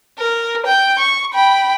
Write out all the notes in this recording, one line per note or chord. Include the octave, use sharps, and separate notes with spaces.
A#4
G5 G6
C#6
G5 B5